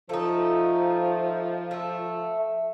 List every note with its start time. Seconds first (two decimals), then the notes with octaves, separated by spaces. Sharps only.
0.09 F3 A3 D#4
1.71 A3 E5